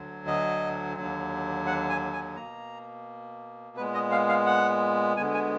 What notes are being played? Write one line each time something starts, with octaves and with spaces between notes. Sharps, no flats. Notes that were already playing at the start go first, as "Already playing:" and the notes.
Already playing: D2 D3 F#3
D#5
D#2 D3 F#3
F#5
G#5
G#5
B2 A#3 A#5
A#2 G#3 B3 B4
D#5
F5
F5
F#5
D2 D3 G#3 B3 G#5
G#5